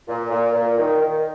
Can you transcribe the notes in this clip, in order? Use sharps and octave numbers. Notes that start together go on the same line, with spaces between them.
A#2
A#2
A#2
D#3
D#3